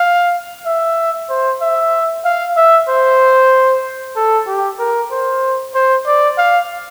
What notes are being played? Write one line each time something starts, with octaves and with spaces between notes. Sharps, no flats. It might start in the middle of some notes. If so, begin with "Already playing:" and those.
Already playing: F5
E5
C5
E5
F5
E5
C5
A4
G4
A#4
C5
C5
D5
F5